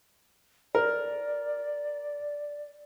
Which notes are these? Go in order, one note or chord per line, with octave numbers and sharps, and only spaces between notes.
A#4 D5